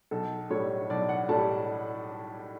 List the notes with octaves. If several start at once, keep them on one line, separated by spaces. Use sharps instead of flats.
B1 A4
A2 G3 C#5
B1 D5
F#5
A2 G3 A5